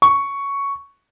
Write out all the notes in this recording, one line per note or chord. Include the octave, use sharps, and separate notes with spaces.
C#6